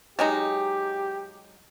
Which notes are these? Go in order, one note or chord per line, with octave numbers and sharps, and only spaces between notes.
F#3 G#3 D#4 G4